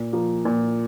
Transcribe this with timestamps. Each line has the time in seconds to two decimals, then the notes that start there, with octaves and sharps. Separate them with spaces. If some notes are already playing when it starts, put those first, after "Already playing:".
Already playing: A#2
0.12 F3 A#3
0.45 A#2